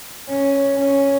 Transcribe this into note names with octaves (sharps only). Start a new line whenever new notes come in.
C#4
C#4